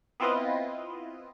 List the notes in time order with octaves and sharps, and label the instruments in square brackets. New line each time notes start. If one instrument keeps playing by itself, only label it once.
[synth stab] B3 C4 E4 F4 B4 D#5